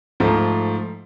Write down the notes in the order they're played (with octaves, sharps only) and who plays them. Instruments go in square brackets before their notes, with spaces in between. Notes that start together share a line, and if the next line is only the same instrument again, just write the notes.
[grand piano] G#2 F3 A3